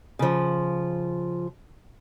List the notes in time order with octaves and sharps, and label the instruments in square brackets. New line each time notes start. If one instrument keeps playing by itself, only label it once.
[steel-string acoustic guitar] C#3 F3